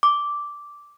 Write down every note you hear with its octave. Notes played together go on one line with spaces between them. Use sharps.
D6